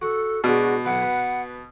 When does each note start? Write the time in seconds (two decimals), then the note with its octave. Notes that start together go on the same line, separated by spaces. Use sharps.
0.02 F#4 A4
0.44 B2 G#3 D4 F#4
0.85 B1 E4 B4 F#5
1.02 B4